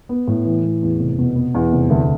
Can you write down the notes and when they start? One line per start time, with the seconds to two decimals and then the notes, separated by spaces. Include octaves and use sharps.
0.09 B3
0.28 A2
0.45 E3
0.64 A2
0.83 E2
1.00 F1
1.19 B2
1.36 B3
1.54 E2
1.73 F1
1.90 D2